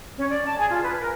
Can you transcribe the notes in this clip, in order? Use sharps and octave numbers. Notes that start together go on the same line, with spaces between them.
C#4
D5
A5
G#4
F4
B4
A#4